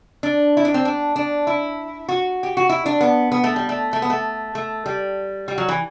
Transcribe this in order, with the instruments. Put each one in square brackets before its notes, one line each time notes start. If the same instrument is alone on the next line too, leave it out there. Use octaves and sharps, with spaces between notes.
[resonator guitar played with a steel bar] D4
E4
D4
C4
D4
D4
E4
F#4
G4
F#4
E4
D4
B3
B3
A3
G3
A3
A3
B3
A3
A3
G3
G3
F#3
E3